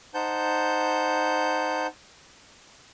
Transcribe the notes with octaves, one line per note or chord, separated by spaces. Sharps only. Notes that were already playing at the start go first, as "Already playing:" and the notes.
D#4 C5 F#5 A5 G6